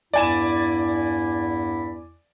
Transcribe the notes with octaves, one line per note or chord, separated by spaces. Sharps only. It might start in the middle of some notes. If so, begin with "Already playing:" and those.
E2 G2 E4 D5 G#5 E7